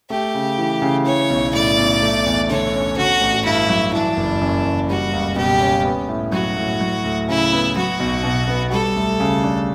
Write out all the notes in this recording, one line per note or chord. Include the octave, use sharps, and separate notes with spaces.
A3 G4
C#3
E3
C#3
E3 C#5
B1
A2 D5
B1
A3
E2
D3 C#5
C#4
D3 F#4
A1
G2 E4
F#3
E3 D4
F#1
F#2
F#1
G3 F#4
C#2
B2 G4
C#4
B3
A2
F#3 F#4
A2
F#3
D2
C#3 E4
B3
F#3 F#4
B1
B2
B3
G3 A4
D2
C#3
D4